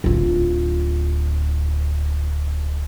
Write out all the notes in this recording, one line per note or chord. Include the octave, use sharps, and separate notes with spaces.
D1 F4